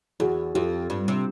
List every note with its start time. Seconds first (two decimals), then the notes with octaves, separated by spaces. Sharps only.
0.20 E2 F#4 G#4
0.54 F2 F4 G4
0.90 G2
1.08 C3